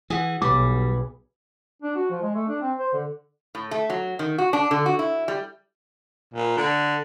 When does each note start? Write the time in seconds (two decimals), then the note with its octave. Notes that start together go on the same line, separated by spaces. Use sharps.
0.10 E3 G#4 F#5
0.42 B1 G3 B4 D6
1.82 D4
1.96 F#4
2.10 F3
2.22 G#3
2.35 A3
2.48 D4
2.62 C4
2.79 C5
2.93 D3
3.55 A2
3.71 A3
3.90 F#3
4.19 D#3
4.38 F#4
4.53 D4
4.71 D3
4.86 F#4
4.99 E4
5.28 G3
6.34 A#2
6.57 D3